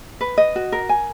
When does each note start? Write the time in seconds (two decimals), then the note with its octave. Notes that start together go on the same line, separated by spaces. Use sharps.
0.21 B4
0.38 D#5
0.56 F#4
0.72 A#4
0.89 G#5